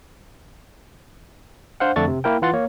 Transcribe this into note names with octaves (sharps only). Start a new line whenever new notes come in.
D4 C5 F5 F#5
F2 D3 A3 D4 C#6 A6
C3
A#3 E4 A#4 G5
E3 F4 F#5 C6 A6
A#3 C#5